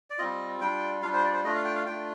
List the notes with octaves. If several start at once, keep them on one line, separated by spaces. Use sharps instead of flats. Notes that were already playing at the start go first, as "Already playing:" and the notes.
D5
G3 C4 F4 D#5
G3 D4 F4 G5
G3 D4 F4 F5
C5
D5
C5
A3 D4 F4 D#5
F5
G5
F5
A3 D4 F4 G5